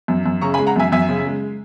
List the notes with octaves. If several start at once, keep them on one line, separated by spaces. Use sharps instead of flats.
F#2
F#2
C#3 A#5 C#6
G#5 B5
G#3
F#5 A#5
F#2 E5 G#5
F#2 E5 G#5
C#3
G#3